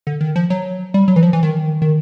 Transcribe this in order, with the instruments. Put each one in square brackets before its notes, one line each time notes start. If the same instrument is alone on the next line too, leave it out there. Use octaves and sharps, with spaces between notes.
[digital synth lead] D3
D#3
F3
F#3
G3
F#3
E3
F3
E3
D#3
D#3